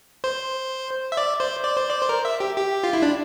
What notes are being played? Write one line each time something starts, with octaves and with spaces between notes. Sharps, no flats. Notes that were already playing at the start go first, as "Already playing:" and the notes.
C5
E5
D5
C5
D5
C5
D5
C5
A#4
E5
G4
G4
F4
E4
D4